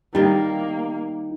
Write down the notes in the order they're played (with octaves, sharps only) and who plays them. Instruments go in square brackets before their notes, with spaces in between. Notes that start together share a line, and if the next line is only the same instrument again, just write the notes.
[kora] D#3 G3 [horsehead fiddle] A#3 [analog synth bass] D#4